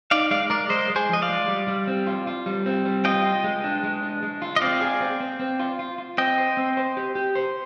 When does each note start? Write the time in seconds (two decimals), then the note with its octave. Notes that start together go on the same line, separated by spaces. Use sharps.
0.11 D#4 D5 F5
0.31 G#3 D5 F5
0.50 G#3 A#4 D5
0.70 G#3 C5 D#5
0.90 G#3
0.96 G#4 C5
1.09 F3 D#5
1.22 D5 F5
1.29 G#3
1.48 G3
1.68 G3
1.87 C4
2.07 F4
2.27 F4
2.46 G3
2.66 C4
2.85 G3
3.05 F4 D#5 G5
3.24 F4
3.44 G#3
3.64 D4
3.83 G#3
4.03 D4
4.23 G#3
4.42 F4
4.56 D#5
4.61 C4 D5 F5
4.81 G#4
5.00 C4
5.20 C4
5.40 C4
5.59 F4
5.79 F4
5.98 F4
6.18 C4 D#5 G5
6.38 C5
6.57 C4
6.77 C5
6.97 G4
7.15 G4
7.35 C5